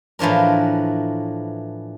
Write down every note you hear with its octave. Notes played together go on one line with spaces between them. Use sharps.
A2 E3 F3 D4 A#4